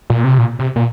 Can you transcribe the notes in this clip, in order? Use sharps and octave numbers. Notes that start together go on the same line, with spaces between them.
A#2
C3
A#2
C3
A#2